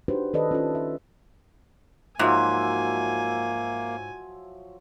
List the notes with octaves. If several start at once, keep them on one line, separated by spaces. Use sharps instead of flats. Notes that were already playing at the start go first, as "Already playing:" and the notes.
D4 D#4 F#4 G4 B4 C5
D#3 A4 B4 D5 D#5
C#4 F4 A4
E5
G#2 F3 F#3 A#3 E5 G#5